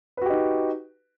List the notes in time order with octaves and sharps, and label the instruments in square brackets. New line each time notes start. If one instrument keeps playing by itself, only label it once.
[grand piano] B4
F#4
G4
D#4